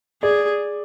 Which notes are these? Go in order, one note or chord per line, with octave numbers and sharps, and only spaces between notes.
G#4 D5